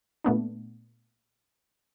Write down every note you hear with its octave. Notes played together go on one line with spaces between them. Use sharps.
A#2 A3 B3 D4